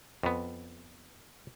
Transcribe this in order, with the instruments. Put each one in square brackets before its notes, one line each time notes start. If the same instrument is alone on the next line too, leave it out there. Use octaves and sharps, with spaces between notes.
[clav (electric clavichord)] F2 B3